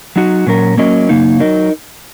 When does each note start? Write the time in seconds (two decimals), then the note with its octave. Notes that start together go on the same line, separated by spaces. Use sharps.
0.16 F#3 D#4 F#4
0.47 A#2 F#3 C#4 A#4
0.77 F#3 A#3 C#4 A#4 D#5
1.09 F#2 C#3 A#3 D#4
1.40 F#3 D#4 A#4 D#5